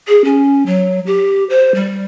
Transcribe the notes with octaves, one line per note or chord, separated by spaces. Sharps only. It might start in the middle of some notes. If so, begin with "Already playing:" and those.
G#4
C#4
F#3
G4
C5
G3